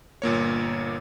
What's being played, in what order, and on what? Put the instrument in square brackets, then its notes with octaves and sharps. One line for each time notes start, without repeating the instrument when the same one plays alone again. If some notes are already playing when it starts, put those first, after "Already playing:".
[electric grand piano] G1 A#2 A#3 C#5